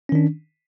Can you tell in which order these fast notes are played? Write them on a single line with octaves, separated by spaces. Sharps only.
C#4 D#3 D4